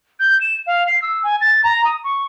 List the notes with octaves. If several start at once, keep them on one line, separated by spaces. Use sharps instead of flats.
G6
E7
F5
C7
E6
G#5
A6
A#5
D#6
C#6